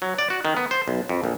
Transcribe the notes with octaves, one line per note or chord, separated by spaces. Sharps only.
F#3
D5
F#4
D#3
B3
C5
B1
F2
A#1